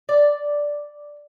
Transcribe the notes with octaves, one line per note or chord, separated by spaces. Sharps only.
D5